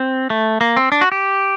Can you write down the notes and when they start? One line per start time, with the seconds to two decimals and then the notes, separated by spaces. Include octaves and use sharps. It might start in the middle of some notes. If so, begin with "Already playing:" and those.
Already playing: C4
0.30 A3
0.61 A#3
0.77 C4
0.92 D4
1.01 F#4
1.12 G4